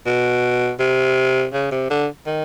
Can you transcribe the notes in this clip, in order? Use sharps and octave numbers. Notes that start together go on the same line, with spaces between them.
B2
C3
C#3
C3
D3
D#3